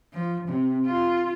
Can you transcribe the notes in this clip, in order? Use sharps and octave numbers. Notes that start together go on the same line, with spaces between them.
F3
C3
F4